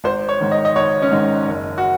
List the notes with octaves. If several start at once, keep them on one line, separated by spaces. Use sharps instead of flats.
G#1 C5
C#5
G#2 D#3
D#5
D#5
G#1 C#5
C#4
G#2 D#3 D#4
F#1
F#4